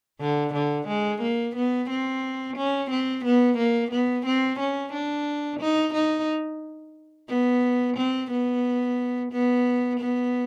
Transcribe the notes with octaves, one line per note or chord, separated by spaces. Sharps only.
D3
D3
G#3
A#3
B3
C4
C#4
C4
B3
A#3
B3
C4
C#4
D4
D#4
D#4
B3
C4
B3
B3
B3